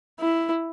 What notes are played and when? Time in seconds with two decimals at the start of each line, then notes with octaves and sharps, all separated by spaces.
0.20 E4